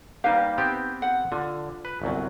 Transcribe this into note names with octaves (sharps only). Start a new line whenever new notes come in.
G3 A#3 D#4 G4 B4 F5
B3 C4 G4
F#5
D3 F4
B4
G1 C2 F#3